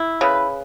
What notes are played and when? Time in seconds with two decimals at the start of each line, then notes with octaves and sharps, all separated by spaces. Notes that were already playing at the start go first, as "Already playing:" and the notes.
Already playing: E4
0.21 C#3 B4